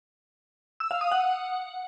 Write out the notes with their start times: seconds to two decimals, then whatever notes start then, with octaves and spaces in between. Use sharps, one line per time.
0.80 E6
0.91 F5
1.01 D#6
1.11 F#5